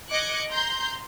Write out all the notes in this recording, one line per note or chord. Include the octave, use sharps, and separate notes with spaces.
D#5 D6 F#6 G#6 C#7
A#5 C6 G6